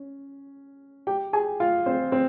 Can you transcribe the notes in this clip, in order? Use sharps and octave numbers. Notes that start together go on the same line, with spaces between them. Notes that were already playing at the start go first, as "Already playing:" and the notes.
Already playing: C#4
G4 G5
G#4 G#5
F4 F5
C4 C5
C4 C5